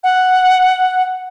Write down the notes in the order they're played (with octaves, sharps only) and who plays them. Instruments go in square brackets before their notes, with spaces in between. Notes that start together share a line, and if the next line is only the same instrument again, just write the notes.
[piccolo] F#5